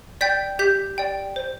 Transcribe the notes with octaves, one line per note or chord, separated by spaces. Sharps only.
D5 G5 G6 B6
G4 G6 B6
D5 G5
C5